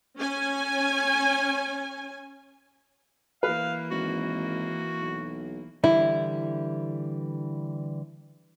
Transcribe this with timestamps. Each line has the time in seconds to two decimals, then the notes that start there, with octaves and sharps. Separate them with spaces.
0.20 C#4 G#5
3.43 E3 A#3 B4 F5
3.91 G#1 F#4
5.01 B1
5.84 D3 E3 G3 E4